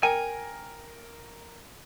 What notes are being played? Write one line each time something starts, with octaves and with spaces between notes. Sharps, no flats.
A#4 G5 G#5